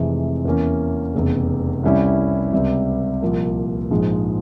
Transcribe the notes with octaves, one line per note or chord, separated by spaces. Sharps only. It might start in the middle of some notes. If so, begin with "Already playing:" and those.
Already playing: F1 F2 C3 E3 G#3
E2 E3 A#3 C#4
F1 E2 C#3
C2 C3 G3 C#4 E4
C#2 C3 G3
C2 A#2 F3 A#3
A#1 G#2 F3 G#3